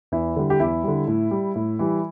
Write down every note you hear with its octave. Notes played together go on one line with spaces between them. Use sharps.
E2 E4
D3 G3
G4
E2 E4
D3 G3
A2
G3
A2
E3 G3